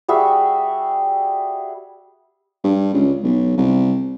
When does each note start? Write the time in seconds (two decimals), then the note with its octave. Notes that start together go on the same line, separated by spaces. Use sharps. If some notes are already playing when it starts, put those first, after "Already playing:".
0.08 G3 F#4 G#4 E5
2.64 G2
2.94 C#2
3.23 B1
3.57 C2